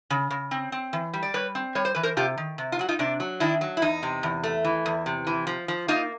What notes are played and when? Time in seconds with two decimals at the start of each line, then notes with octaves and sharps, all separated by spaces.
0.10 C#3
0.30 C#3
0.51 C4
0.72 C4
0.93 E3
1.13 G3
1.23 D5
1.34 G3 B4 C#5
1.55 C4
1.75 G3 C#5
1.85 C5
1.95 E3 B4
2.03 A#4 C5
2.17 C3 F4 G4
2.38 D#3
2.58 C3
2.72 F4
2.79 F#3 F#4
2.88 D#4 F4
2.99 C3 D4
3.20 F#3
3.40 D#3 D4 E4
3.61 F#3
3.77 E4
3.82 E2 D#4
4.03 C3
4.23 E2
4.43 A3
4.64 E3
4.86 E2
5.06 C3
5.27 E3
5.47 F3
5.68 F3
5.88 A#3 D#4 F4